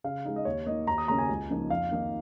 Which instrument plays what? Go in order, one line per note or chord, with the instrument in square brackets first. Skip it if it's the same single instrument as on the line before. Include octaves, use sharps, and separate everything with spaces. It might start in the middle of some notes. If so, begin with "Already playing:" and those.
[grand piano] C#3 F5
G#3 D#4
D#5
D#2 C#5
D#3 A#3 D#5
D#2 A#5
D#6
C#3 A#3 C#4 A#5
G#5
C#2
C#3 F3 A#3 D#4
F2 F5
D#3 A#3 D#4